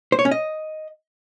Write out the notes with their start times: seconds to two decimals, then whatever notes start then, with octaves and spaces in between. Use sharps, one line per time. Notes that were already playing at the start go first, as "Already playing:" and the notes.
0.12 C5
0.19 C#5
0.25 C#4
0.31 D#5